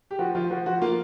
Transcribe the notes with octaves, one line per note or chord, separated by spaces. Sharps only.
G4
F3 F#4
F3 F4
F3 F#4
F3 F#4
A#3 F4